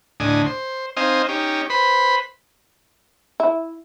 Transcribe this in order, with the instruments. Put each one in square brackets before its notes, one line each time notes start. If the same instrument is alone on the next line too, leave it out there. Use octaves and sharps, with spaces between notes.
[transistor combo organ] D2 A2 D4 D#5 G#5
C5
C4 D#4 C5 D#5 F5 G#5
C#4 D#4 G4
B4 C5 B5
[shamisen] E4